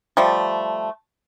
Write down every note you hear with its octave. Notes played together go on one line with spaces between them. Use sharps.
F3 G3 A3